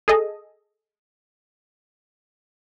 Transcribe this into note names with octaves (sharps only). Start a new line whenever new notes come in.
G#4 A4 D#5